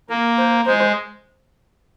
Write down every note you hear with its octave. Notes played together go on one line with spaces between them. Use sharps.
A#3 A#4
C5
G#3 C5